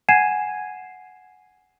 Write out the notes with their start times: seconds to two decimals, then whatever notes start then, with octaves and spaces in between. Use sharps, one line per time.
0.09 F#5 G#5 G#6 C7 D#7 E7